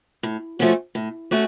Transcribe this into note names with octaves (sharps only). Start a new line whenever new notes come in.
A2
F3 A3 C#4 F#4
A2
A3 C#4 F#4